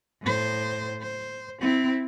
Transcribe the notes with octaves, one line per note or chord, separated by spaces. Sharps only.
A2 C5
C5
C4 E4